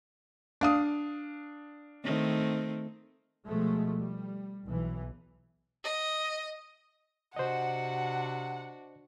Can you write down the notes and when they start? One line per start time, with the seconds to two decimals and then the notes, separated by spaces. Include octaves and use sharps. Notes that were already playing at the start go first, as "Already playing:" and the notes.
0.61 D4 F5 D#6
2.04 D#3 A3 C4
3.47 B2 F3 G#3 A3
3.99 G3
4.66 B1 E3
5.84 D#5
7.36 C3 D4 F#4 C5 D#5 F#5